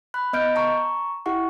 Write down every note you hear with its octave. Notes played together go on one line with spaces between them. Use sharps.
B5 F#6
B3 D#5 F6 G6 D7
A5 A#5 C#6
E4 G4 F#5 C#6